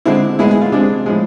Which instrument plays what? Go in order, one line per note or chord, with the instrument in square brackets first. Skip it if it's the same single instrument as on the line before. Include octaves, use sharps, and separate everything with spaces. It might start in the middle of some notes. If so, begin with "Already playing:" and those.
[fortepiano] D3 G#3 C4 E4
A2 G#3 B3 E4
G#4
F4
C3 G#3 C4 D4
A2 F3 G#3